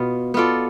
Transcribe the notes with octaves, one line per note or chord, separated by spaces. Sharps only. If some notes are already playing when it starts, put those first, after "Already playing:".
Already playing: B2 B3 F4
B3 F4 A4 D5